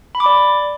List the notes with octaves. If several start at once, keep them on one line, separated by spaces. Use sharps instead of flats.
B5
D6
D5